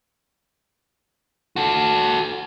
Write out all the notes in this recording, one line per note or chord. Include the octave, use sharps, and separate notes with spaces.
F#4 A4